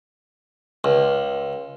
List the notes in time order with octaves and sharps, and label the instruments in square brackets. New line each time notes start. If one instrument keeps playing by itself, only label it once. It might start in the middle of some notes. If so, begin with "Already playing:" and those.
[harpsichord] C#2